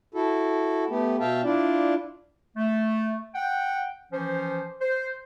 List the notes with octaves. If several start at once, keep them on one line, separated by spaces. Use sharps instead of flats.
E4 F#4 A4
A3 B3 G4
B2 E5 F5 G5 A5
D4 E4 F4 D5
A3
F#5 G5
E3 F3 C#4 C5
C5